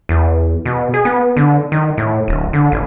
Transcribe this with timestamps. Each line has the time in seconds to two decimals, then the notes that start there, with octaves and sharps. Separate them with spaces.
0.09 E2
0.65 B2
0.94 G#4
1.05 B3
1.37 D3
1.72 D#3
1.98 A2
2.28 D1
2.53 D3
2.72 A1